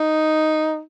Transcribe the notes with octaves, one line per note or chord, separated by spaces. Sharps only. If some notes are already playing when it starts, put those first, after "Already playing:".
Already playing: D#4